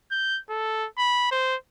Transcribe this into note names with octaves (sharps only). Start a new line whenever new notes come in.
G6
A4
B5
C5